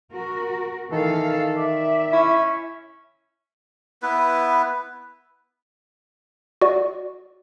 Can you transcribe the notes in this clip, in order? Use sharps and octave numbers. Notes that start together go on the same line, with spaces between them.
F#4 A#4
D#3 E3 A4 F5
D5 E5
C#4 E4
B3 E4 B4
F#4 D5